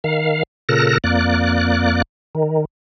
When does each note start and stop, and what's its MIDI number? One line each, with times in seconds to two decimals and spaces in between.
0.04 0.43 51
0.04 0.43 77
0.69 0.98 46
0.69 0.98 49
0.69 0.98 69
0.69 0.98 70
0.69 0.98 90
0.69 0.98 94
1.04 2.02 41
1.04 2.02 58
1.04 2.02 74
1.04 2.02 90
2.35 2.65 51